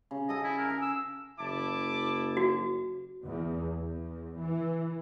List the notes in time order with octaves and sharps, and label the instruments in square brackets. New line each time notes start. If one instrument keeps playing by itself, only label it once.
[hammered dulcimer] C#3
[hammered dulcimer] G#4 A4 F#5 [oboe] D#5
[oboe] E4
A#4
[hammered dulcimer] G#4
[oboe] E6
[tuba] F#1 [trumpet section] E4 A5 D6
[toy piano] F#4
[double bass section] E2
E2
E3